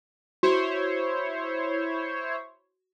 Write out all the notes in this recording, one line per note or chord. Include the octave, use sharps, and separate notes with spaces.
E4 F#4 C5 C#5